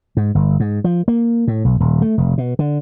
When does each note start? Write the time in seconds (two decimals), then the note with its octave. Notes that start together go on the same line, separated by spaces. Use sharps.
0.17 G#2
0.35 G1
0.60 G#2
0.84 F3
1.08 A#3
1.48 A2
1.65 B1
1.80 D#1
2.02 A3
2.18 F1
2.38 B2
2.59 D3